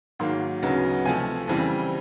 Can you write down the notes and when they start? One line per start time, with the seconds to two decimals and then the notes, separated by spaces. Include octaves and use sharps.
0.19 G#2 D#3 F#3 A#3 C6
0.62 D2 C#3 F#3 B3 D#4
1.05 C3 F3 A3 G#5
1.48 F2 C#3 E3 G3 C4